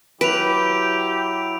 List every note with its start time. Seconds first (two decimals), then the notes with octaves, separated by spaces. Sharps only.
0.21 F#3 E4 G4 B4 D7 F7